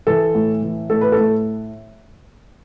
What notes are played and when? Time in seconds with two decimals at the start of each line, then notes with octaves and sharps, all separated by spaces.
0.07 E3 A4
0.35 A2
0.62 E3
0.90 A2 A4
1.01 B4
1.12 A4
1.18 A2